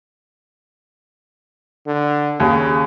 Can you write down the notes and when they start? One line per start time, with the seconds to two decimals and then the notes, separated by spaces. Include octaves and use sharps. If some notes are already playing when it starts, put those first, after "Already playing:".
1.87 D3
2.40 D#2 C#3